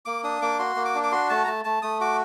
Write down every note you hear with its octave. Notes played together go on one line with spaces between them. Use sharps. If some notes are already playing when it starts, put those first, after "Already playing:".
A#3 D6
D4 D#6
A#3 D6
F#4 C6
A#3
D6
D4
D6
F#4 C6
A3 A5
A#5
A3 A5
A3 A5
A3 D#6
F#4 D6